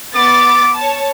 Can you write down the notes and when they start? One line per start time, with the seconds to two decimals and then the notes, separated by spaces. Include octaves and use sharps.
0.15 B3 D6 A6
0.75 C#5 A5